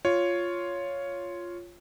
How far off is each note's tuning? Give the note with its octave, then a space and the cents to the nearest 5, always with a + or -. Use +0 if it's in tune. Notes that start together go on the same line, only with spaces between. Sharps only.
F4 +0 C#5 +5